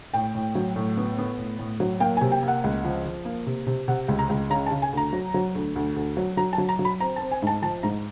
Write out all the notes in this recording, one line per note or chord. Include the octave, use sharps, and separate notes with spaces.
A2 G5
A2
F#3
A2
B3
B3
A2
A2
F#3
A#3 G5
G#5
C3
G5
A#3
F#5
C#2
F3
F3
A#3
C3
C3
C3 F#5
C#2
A#5
C#2
C#3 A#5
A5
C#3
G#5
D2 A#5
F#3
F#3
D2
D2
D2
F#3
F#3 A#5
A5
F#3
A#5
F#3
B5
C4 A#5
A5
C4
G#5
G#2 A5
F3 A5
G#2 A#5